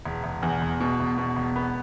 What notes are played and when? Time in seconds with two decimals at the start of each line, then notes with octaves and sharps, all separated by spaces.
0.05 E1
0.24 E1
0.43 E2
0.62 E1
0.80 B2
1.00 E1
1.18 B2
1.36 E1
1.56 B3